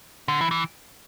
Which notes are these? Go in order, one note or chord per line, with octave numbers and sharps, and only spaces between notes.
D3
E3
E3